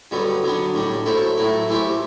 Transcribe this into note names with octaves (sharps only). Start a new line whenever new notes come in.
G2 D3 F#3 B3
D3 F#3 B3 D4
A2 G3 D4
F#3 A3 E4 A4 C5
A2 F#3 A3 E4
E3 A3 E4 G4 C5